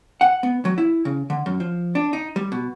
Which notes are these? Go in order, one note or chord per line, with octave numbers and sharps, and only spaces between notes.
F#5
B3
F#3
E4
C#3
D3
F#2
F3
D4
D#4
G3
B2